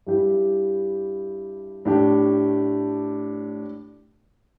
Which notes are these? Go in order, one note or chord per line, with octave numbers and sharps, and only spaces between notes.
G2 G3 E4 G4
A2 A3 D4 G4